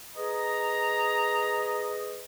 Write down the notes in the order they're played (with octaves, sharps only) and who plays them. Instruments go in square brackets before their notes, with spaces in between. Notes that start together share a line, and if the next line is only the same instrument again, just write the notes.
[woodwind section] G#4 B4 D#5 [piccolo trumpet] A#5